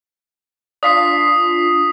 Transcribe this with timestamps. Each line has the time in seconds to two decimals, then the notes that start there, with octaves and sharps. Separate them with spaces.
0.83 D4 F4 D#6 B6 C7